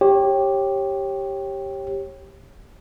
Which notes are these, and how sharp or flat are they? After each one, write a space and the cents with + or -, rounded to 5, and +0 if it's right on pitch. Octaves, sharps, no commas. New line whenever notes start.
G4 +0 C#5 -25